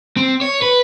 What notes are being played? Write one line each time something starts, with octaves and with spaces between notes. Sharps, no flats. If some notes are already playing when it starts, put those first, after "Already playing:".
C4
C#5
B4